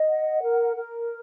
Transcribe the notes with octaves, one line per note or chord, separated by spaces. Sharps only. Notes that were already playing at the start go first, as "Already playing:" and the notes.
Already playing: D#5
F#5
A#4
A#4